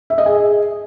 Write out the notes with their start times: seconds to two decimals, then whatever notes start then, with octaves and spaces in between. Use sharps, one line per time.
0.10 E5
0.18 D#5
0.26 G#4